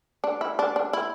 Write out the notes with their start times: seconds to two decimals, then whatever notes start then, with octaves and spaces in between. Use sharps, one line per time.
0.24 D4
0.41 E4
0.59 D4
0.76 D4
0.93 E4